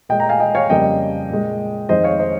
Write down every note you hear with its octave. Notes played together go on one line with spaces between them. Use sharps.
A#2 G#3 D#5 G5
G5 A#5
F5 G#5
D#5 G5
C#5 F5
F2 C#3 G3 A#3 D#5 G5
A#2 G#3
F2 D#3 G#3 C5 D#5
C#5 F5
C5 D#5